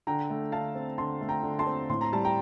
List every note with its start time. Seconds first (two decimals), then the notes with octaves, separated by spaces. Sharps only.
0.07 D3 G5 A#5
0.30 A3
0.52 D3 F5 A5
0.75 C4
0.98 D3 A5 C6
1.21 A3
1.29 G5 A#5
1.43 D3
1.59 A5 C6
1.67 C4
1.89 A2 C6
2.01 A#5
2.13 G3 A5
2.25 G5 A#5